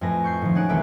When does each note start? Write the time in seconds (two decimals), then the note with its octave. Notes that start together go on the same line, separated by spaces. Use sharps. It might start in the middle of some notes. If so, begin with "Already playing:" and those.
0.01 F2 A2 A3 B4 G#5 A#6
0.24 C#6 G6 C7
0.41 A2 D#3 F3
0.55 G#3 C#4 D#4 F#5 D7
0.69 C2 D#3 E3 A3 B4 D7